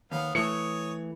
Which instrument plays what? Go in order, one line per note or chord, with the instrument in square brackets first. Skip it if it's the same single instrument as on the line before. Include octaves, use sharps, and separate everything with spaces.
[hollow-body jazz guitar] D#2 [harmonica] B3 F5
[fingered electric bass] E3 [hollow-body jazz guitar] A3 [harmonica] C#5 D#6 [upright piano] C#7